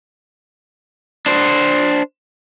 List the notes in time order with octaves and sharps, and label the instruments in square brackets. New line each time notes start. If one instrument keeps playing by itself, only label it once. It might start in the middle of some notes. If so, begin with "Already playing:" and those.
[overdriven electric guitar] D4 C5